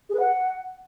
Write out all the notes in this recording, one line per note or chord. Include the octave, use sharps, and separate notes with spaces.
G#4
B4
F#5